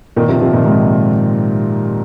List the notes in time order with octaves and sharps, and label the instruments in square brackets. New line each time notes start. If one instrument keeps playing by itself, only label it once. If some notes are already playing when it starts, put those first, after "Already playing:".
[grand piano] A#2 D#3
C3 F3
C3 F3
A#2 D#3
G#2 C3